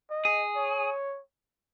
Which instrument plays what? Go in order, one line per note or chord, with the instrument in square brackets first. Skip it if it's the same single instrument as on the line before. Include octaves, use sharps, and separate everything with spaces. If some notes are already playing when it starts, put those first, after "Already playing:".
[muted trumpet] D#5
[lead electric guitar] G#4
[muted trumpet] C#5